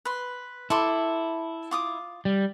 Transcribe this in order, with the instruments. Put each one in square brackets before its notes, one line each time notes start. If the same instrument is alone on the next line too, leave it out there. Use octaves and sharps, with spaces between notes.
[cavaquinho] B4 C6
[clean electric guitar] E4 [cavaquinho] A4 C6 D6
[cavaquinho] F4 D6 D#6
[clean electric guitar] G3